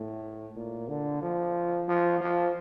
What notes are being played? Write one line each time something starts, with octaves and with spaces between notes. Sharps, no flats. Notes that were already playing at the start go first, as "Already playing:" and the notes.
Already playing: A2
A#2
D3
F3
F3
F3